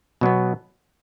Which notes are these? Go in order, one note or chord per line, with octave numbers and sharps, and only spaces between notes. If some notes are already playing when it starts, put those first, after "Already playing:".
B2 F#3 B3